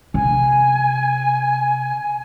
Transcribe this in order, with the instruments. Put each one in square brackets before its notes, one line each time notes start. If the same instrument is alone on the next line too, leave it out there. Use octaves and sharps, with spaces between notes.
[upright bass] C3 [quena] G#5